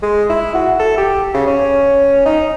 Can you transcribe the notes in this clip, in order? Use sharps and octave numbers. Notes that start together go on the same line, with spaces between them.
G#3
E4
F#4
A4
G4
C#3
C#4
D#4